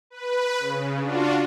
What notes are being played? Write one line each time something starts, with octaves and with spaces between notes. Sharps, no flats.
B4
C#3
D4 F4 F#4